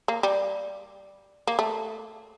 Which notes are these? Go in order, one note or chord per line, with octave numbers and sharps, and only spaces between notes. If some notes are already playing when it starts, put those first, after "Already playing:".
A#3
G3
A#3
A3